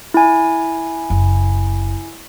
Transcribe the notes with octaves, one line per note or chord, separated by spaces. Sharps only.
E4 G#5
F#1